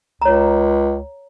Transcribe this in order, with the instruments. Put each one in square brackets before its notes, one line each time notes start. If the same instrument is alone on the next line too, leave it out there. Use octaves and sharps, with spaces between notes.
[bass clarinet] C#2 [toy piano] C#5 A#5